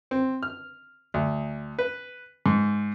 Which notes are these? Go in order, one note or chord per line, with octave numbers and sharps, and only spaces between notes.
C4
F6
D2
B4
G#2